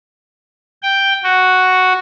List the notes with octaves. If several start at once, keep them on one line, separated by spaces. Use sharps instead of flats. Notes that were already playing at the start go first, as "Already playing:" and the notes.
G5
F#4